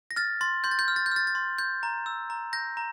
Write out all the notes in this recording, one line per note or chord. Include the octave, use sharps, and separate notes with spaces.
A#6
F6 A6
C6 A6
C6 G6
A6
G6
F6
A6
G6
F6 A6
A6
C6
G6
A#5
E6
A#5
G6 A#6
A#5